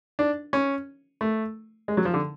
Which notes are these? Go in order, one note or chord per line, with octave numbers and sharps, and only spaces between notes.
D4
C#4
A3
G#3
F#3
F3
D3